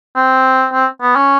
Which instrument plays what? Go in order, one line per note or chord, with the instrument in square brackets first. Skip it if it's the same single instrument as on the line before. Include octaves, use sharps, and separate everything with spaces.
[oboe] C4
C4
B3
C#4